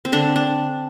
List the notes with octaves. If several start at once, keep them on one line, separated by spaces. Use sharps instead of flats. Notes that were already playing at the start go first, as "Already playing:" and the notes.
C4
D3 D4
D4